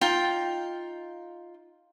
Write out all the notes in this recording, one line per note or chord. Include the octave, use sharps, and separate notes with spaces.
D#4 F4 G5